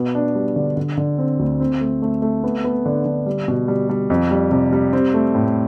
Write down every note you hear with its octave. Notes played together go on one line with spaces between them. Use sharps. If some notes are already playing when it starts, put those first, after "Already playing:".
Already playing: B2 B3
D4
G3
D3
D3
D3
C4
D2
C4
A3
A3
A3
B3
B3
D3
D3
G3
B2
G3
G3
F2
G3
C3
G3
C4
A3
A2